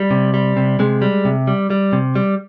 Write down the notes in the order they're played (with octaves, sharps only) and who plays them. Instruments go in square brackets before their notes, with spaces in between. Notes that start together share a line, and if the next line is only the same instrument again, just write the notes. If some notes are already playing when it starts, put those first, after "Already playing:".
Already playing: [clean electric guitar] G3
C3
G3
C3
C3 G#3
G3
C3
G3
G3
C3
G3